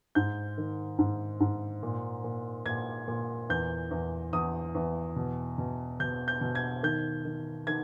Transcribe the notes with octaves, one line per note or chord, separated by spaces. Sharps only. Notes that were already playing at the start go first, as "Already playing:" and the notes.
G#2 G6
D#3
G#2
G#2
A#2
A#2
A#2 G#6
A#2
E2 G6
E2
E2 D#6
E2
B2
B2
B2 G6
G6
B2
G#6
D#3 G6
D#3
D#3 G#6